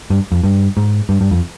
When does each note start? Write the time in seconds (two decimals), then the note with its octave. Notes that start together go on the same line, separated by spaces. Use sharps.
0.10 G2
0.32 F2
0.43 G2
0.77 G#2
1.09 G2
1.21 G2
1.31 F2